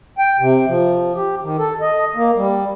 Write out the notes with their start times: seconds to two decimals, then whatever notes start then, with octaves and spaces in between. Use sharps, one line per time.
0.18 G5
0.40 C3
0.68 F3
1.15 G4
1.43 D#3
1.59 A4
1.81 D#5
2.16 A#3
2.36 G3